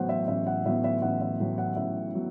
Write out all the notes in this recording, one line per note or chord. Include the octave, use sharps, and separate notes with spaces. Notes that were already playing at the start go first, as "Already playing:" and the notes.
Already playing: A1 A2 F#3 B3 C5 F#5
E5
A1 E5
F#5
A2 F#3 B3 E5
E5
A1 F#5
E5
A2 F#3 B3
F#5
A1 E5
F#3 B3